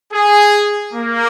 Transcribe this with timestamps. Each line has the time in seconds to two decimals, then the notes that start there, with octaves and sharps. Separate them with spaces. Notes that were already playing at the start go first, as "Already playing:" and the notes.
0.13 G#4
0.93 A#3